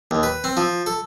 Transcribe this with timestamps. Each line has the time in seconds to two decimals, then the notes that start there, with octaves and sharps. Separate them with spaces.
0.11 D#2
0.23 B4
0.44 C4
0.57 F3
0.86 A4